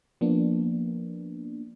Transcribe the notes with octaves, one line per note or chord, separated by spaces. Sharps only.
F3 A#3 B3 D4